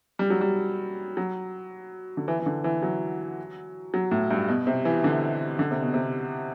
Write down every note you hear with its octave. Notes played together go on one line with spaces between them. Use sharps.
G3
F#3
G3
F#3
D3
E3
E3
D3
E3
F#3
F#3
A2
G2
B2
C3
E3
D3
D3
C3
B2
C3